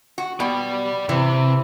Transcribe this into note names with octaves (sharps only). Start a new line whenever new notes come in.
F#4
B2 D5 G5
C3 E3